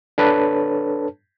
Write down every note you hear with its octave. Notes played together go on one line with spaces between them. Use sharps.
D4 A4 B4 C#5 A5